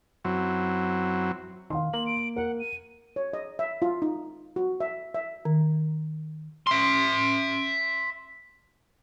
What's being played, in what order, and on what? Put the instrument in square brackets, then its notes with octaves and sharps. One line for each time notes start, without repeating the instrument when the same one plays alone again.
[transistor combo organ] F#2 F#3 C4 E4
[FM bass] D#3 [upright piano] F5 C6
[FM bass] A#3 [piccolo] F#7
[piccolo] D7
[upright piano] A#4 [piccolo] F#5
[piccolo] D#7
[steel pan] C#5
D#5
E5
F4
D#4
F#4
E5
E5
[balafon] D#3
[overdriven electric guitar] E5 C6